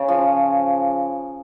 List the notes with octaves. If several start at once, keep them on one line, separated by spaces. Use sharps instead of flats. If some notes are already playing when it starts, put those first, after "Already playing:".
Already playing: C#3
F3